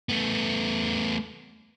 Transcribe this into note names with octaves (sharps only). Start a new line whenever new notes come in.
A3 B3